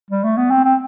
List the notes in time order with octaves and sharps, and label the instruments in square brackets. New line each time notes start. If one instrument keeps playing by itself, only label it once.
[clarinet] G3
A3
B3
C4
C4